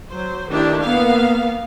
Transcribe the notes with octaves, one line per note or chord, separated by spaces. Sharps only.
F#3 C5
D#3 A3 D4 E4 G4
A#3 B3 F5